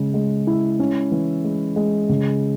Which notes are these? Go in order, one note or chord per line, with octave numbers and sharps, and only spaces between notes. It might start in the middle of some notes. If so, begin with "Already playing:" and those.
Already playing: C#3 G#3
G#3
E4
C#4
E3
G#3
G#3
C#3